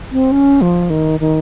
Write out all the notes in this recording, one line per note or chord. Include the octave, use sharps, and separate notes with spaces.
C4
C#4
F3
D#3
D#3